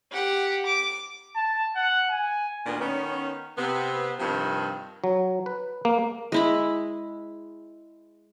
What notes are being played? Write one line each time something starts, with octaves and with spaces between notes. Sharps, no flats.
G4 F#5
D6
A5
F#5
G#5
D2 A#2 D#3 B3 D4
D#3 B3 C#4
C3 B3
G2 C3 D#3 F3 C4
F#3
B4
A#3
G#3 E4 B5